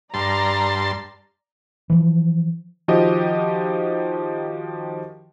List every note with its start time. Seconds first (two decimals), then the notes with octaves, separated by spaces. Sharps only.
0.14 G2 D5 A5 A#5 C6
1.90 E3 F3
2.88 D#3 F3 F#4 G4 A#4 D#5